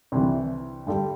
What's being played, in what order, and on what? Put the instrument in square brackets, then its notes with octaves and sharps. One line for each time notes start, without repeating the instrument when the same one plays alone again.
[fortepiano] C2 C3 E3
G2 D3 G3